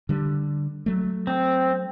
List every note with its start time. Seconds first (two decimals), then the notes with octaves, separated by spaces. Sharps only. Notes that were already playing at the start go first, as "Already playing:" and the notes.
0.09 D3 G3
0.86 F#3 A3
1.27 C4